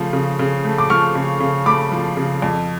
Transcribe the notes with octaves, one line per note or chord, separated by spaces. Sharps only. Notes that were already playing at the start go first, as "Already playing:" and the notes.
Already playing: C#3 F3 A3
C#3
C#3
A3
D6
F3 C#6 F6
C#3
C#3
A3 B5 D6
F3
C#3
F2